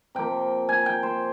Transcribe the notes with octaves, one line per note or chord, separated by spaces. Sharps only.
C3 F3 A#3 G5
G#5
G5
C5